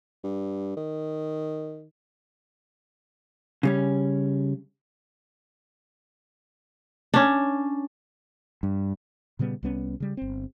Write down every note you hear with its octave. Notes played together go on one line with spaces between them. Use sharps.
G2
D#3
C#3 G3 C#4
C#4 D4
G2
A#2 C#3 G3 B3
C2 G3 B3 C#4
C#3 G3
G1 C4